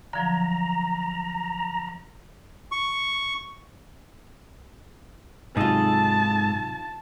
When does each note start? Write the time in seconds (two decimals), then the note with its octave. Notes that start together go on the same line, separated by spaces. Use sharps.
0.13 D3 F3 F#3 A#5
2.72 C#6
5.57 G#2 C3 F#3 D#4 F4 G#4 A4 A5